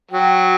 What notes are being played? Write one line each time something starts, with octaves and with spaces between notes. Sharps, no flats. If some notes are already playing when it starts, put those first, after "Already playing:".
F#3 G5